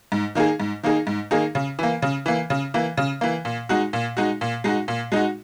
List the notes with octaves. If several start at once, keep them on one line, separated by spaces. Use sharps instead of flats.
G#2
D#3 A#3 D#4 G#4
G#2
D#3 A#3 D#4 G#4
G#2
D#3 A#3 D#4 G#4
C#3
E3 A#3
C#3
E3 A#3
C#3
E3 A#3
C#3
E3 A#3
A#2
G#3 D#4 F#4
A#2
G#3 D#4 F#4
A#2
G#3 D#4 F#4
A#2
G#3 D#4 F#4